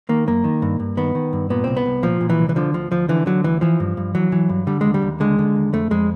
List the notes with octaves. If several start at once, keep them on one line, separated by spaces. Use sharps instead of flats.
D#3 A#3
F#2 A#3
D#3
G2
G2
D#3 B3
D#3
G2
A#2 B3
C2 C4
B3
C2
A#2 F3
A#2
E3
C2
E3
D3 F3
D2 F3
D2 F3
D3 E3
D3 F#3
D2 E3
E3 F3
G2
G2
E3 F#3
E3
G2
D3 G3
D#2 G#3
G3
D#2
D3 G#3
D3
D#2
F2 A3
F2 G#3